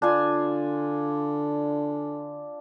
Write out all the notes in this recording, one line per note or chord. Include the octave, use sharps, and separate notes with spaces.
D3 D4 F4 G#5